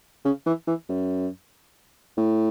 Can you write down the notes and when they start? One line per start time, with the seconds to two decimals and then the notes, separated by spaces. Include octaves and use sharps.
0.25 C#3
0.46 E3
0.67 E3
0.89 F#2
2.17 A2